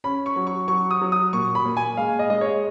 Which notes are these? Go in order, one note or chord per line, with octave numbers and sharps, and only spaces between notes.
C#4 B5
C#6
F#3
C#6
F#3 C#6
D#6
F#3
D#6
A#2 C#6
B5
A#2
G#5
G#3 F5
D#5
G#3 D#5
C#5